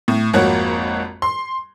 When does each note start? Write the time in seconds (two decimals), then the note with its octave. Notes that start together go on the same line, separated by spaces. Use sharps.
0.08 A2
0.33 G#1 F2 A#3 F#4 C#5 F#5
1.22 C6